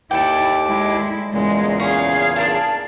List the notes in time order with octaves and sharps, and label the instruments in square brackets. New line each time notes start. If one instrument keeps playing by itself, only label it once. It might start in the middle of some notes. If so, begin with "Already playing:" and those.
[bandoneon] D#2 D6 [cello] E4 [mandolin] A4 D5 G5
[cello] G#3 E4
[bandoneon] E2 A#2 C#3 [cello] G#3
[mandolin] C#4 [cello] G#4 F5
[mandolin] D4 A#4 A5